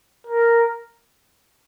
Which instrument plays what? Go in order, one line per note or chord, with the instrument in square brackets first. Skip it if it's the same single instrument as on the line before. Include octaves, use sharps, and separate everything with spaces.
[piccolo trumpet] A#4